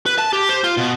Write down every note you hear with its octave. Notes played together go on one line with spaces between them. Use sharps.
B4
A5
G4
C5
F4
B2